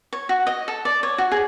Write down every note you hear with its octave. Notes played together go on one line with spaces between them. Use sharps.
C#5
F#4
D#5
A4
D5
C#5
F#4
G#4